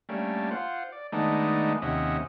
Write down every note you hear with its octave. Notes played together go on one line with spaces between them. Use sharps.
G3 A3 A#3 C#4 D4
F4 C5 F#5
D5
D#3 G#3 A3 B3 D4 D#4
D#2 C3 C#4 D#5 E5 F#5